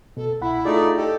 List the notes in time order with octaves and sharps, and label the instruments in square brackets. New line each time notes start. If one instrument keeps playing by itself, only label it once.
[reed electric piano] B2 [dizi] A4
[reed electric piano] C2 F#5 B5 [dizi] E4
[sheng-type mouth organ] A3 D#4 D5 [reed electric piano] F4 G#4
[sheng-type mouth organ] G4 A4 [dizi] D#5